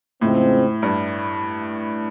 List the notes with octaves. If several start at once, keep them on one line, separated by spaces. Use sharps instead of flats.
F2 A2 C#3 F3 G#3 C4
G2